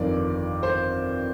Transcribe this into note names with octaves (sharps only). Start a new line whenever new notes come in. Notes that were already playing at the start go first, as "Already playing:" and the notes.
Already playing: G1 F2 D#3 D5
C5